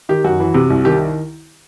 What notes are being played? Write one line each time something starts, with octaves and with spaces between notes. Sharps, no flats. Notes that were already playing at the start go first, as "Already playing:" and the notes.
D#3 G4
F#2 F#4
E3
C3
C2
D#3 G4